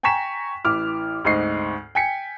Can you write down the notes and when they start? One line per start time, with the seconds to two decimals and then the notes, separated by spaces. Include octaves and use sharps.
0.03 G5 G#5 A#5 C#6 B6 E7
0.65 A1 E3 D6 F6
1.25 D2 G#2 C4 D#5 C#6 C7
1.95 G5 G#5 B6 C#7